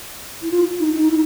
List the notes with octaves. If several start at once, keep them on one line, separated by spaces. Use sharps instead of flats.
E4
F4
D#4
D#4
E4